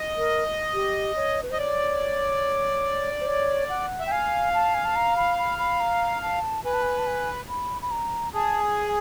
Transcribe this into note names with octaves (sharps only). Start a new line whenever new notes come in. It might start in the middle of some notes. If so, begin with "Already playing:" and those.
Already playing: D#5
A#4
G4
C#5
B4
C5
D#5
C#5 D5
C5
C#5
F#5
E5
G5
F5 G#5
A5
G#5
A5
A#5
B5
B5
B5
A#5
A5
B4 G#5
A5
G#5
A5
G#5
B5
B5
A#5
G#4 A5
G#5